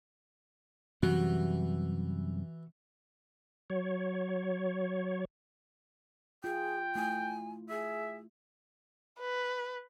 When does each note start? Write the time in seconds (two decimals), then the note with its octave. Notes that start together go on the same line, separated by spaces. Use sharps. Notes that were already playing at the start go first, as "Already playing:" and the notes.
1.03 F#2 C3 E3 G3 F#4
3.70 F#3 C#5
6.44 F4 G#4 G5
6.95 A3 E4 G#5
7.70 G#4 E5
9.19 B4